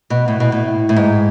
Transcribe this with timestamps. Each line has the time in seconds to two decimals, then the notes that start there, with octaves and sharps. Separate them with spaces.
0.10 B2
0.28 A2
0.40 B2
0.52 A2
0.89 A2
0.96 G#2